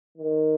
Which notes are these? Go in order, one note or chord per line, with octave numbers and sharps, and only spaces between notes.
D#3